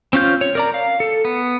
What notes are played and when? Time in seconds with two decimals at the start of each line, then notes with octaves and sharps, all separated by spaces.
0.13 C4 C#4 F4 G6
0.41 C#5
0.55 A#4 D5 A#5
0.74 F5
1.00 A4
1.25 B3